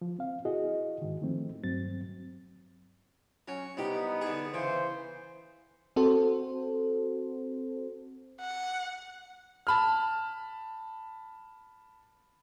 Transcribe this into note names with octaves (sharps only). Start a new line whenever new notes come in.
F3
C4 F5
E4 F#4 G#4 D#5
G#2 D#3
D#3 F3 A3 C4
G2 F#3 C4 A6
F#3 C#4
C2 B3 D#4 G4
D3 G#4
C#3 E3 C5
C4 F#4 A4 C5
F#5
A5 B5 F6